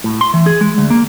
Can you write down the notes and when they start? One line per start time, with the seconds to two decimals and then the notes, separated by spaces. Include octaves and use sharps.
0.04 A2
0.21 C6
0.34 E3
0.46 G#4
0.61 G#3
0.78 D2
0.90 A#3